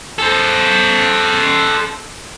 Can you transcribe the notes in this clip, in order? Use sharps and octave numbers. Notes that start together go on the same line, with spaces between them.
A4 C5